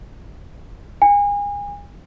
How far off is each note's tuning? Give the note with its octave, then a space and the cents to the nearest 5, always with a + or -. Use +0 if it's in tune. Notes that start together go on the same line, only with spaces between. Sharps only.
G#5 -30